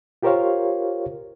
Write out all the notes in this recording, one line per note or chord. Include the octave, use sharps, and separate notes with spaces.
F4 G4 A#4 C5 C#5 F5